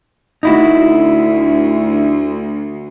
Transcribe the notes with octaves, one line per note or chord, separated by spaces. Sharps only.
D2 D#4 E4 F#4